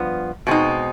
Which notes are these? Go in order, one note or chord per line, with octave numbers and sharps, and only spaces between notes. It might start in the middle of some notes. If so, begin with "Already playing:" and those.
Already playing: G2 F3 B3
B2 G#3 C4 D#4